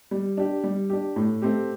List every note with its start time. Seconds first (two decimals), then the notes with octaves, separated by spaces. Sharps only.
0.11 G3
0.37 D4 G4
0.64 G3
0.90 D4 G4
1.16 A2
1.42 A3 C4 G4